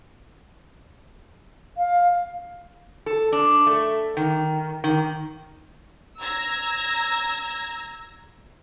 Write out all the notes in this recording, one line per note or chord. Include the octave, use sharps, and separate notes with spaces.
F5
A4
D4
A3
D#3
D#3
A#5 E6 G#6 A#6